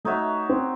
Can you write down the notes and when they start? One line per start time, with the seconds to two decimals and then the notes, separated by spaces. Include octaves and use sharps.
0.05 A3 D#4 F#4 C#5 E5
0.49 C4